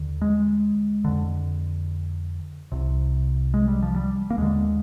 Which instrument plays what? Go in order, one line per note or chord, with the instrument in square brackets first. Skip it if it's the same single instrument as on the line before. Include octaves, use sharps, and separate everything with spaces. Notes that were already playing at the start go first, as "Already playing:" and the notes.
Already playing: [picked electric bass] D#2 D3
G#3
F2 D3
C2 C3
G#3
G3
F3
G3
A#3
D#2 D3 G#3